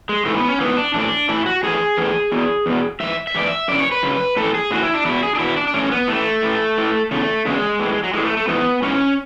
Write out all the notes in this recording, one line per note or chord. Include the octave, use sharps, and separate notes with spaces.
G#3
G#2 E3 A3
B3
C#4
G#2 E3 B3
D4
A2 E3 D4
A2 E3 E4
F#4
A2 E3 G#4
A2 E3
E2 B2
E2 B2
G#2 E3 E5
E5
G#2 E3 D5
E5
F#2 C#3 E3 D5
C#5
B4
F#2 C#3
A2 E3 A4
G#4
A2 E3 F#4
E4
D4
E2 B2 E4
G#4
D4
E2 B2 E4
D4
D4
A2 E3 C#4
B3
A2 E3 A3
A2 E3
A2 E3
E2 C#3 A3
E2 C#3 G#3
A2 E3
F#3
A2 E3 G#3
A3
A3
G#2 E3 B3
G#2 E3 C#4